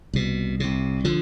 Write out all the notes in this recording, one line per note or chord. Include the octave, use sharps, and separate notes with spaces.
C2 B2
C2 C3
D3 F3